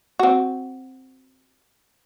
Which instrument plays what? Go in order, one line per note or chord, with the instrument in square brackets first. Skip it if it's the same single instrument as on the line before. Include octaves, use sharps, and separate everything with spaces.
[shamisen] C4 F#4